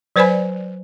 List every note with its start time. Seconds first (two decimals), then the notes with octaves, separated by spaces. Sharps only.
0.16 F#3 B4 C5 D5 G#5 B5